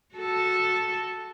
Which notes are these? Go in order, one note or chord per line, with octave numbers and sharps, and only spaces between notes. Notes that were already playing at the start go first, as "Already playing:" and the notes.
F#4 A4